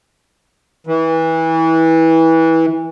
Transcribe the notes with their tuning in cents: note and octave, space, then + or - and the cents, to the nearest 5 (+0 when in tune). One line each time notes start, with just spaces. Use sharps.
E3 -20